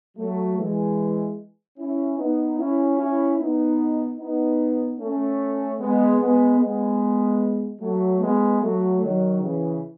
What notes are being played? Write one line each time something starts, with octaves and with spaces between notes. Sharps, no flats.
F#3 A3
E3 G#3
C#4 E4
B3 D#4
C#4 E4
C#4 E4
B3 D#4
B3 D#4
A3 C#4
G#3 B3
G#3 B3
G#3 B3
F#3 A3
G#3 B3
F#3 A3
D#3 F#3
C#3 E3